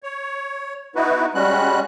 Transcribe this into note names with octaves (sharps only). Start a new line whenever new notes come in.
C#5
B3 D#4 E4 F#4 B4
G3 G#3 C#4 F#4 F#6